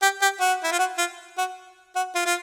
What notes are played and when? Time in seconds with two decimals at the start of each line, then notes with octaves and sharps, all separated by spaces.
0.02 G4
0.21 G4
0.40 F#4
0.63 E4
0.72 F4
0.79 F#4
0.98 F4
1.37 F#4
1.96 F#4
2.15 F4
2.25 F4